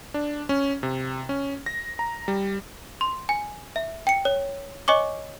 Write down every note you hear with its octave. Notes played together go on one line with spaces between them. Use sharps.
D4
C#4
C3
C#4
A#6
A#5
G3
C6
G#5
E5
G5 C#7
C#5
C#5 D#5 G#5 C#6 D6